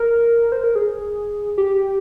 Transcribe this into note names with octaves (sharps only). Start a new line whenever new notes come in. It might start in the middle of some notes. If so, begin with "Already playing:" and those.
Already playing: A#4
C5
A#4
G#4
G4